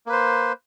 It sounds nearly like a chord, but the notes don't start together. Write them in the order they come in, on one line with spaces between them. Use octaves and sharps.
A#3 B4 C5